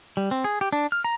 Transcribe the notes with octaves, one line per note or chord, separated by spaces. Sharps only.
G3
C4
G#4
G4
D4
F6
A#5